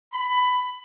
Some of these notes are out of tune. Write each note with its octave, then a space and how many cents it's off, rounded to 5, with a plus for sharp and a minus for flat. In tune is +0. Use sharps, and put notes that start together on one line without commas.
B5 +15